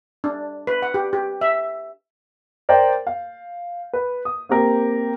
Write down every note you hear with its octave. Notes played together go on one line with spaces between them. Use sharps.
D4
B4
F#5
G4
G4
E5
A#4 C5 D5 G5
F5
B4
D#6
A#3 C4 G4 A#4